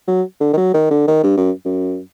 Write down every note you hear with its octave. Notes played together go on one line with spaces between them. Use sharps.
F#3
D3
D#3
F#3
D#3
D3
D#3
G2
F#2
F#2